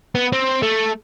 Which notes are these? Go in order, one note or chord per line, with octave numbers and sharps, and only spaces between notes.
B3
C4
A3